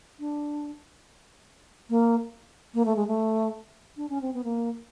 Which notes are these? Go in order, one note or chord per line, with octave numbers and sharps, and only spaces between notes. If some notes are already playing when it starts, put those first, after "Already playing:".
D4
A#3
A#3
A3
G#3
A3
D4
C#4
C4
B3
A#3